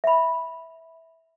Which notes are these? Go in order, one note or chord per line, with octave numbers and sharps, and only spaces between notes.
E5 B5